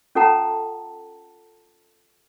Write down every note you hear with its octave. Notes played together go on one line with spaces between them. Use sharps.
C#4 F4 A4 F#5 A5 A#5